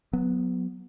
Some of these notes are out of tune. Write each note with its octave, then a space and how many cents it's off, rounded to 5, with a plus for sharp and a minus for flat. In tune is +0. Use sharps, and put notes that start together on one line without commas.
F#3 -20 B3 +0